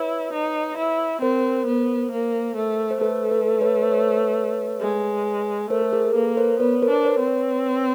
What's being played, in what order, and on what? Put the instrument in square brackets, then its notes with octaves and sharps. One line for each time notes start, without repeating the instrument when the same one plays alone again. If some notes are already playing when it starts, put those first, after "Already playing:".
Already playing: [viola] E4 [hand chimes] B4 C#5
[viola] D#4
E4
[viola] C4 [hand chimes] A#4 C5
[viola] B3
A#3
A3
[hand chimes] C5
[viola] A3 [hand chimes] A4 B4
[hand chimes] A4 B4
B4 C#5
C5
B4 C#5
[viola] G#3
[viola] A3 [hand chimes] A#4 C5
[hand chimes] A4
G#4 A#4
[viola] A#3 [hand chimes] A4 B4
[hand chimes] A#4 C5
[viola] B3 [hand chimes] B4 C#5
[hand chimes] A#4 C5
[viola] D4
[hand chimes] B4 C#5
[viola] C4
[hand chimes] B4 C#5